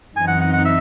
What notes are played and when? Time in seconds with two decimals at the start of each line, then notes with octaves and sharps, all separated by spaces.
0.16 F#2 E3 C4 D#4 G#5
0.28 F#5
0.41 F#5
0.53 F#5
0.65 E5